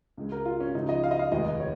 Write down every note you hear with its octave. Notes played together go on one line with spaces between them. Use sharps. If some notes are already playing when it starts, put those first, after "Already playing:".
C#2 C#3 G#3
A#4
F4
C#4
C#2 C#3 F3 D#4
D#5
F5
D#5
F5
F1 D#2 D#3 G#3 D#5
C#5